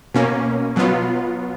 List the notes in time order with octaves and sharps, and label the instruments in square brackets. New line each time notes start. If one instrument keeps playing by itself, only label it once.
[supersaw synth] B2 A#3 C#4
B2 F#3 B3 F4